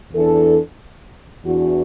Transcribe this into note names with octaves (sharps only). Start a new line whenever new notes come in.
E2 E3 D4 A4
E2 E3 D4 F#4